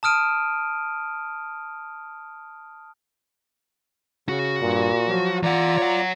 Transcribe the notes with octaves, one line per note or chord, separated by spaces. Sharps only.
A5 D#6 F6 D7 D#7
C#3 F#4
G2 A#2
F3 F#3
E3 F4 D5 F#5 A#5
C#5 F#5